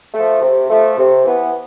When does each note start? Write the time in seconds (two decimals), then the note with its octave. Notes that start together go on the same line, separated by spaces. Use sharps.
0.14 A3
0.19 F3
0.42 C3
0.69 F3 A3
0.98 C3
1.25 E3 B3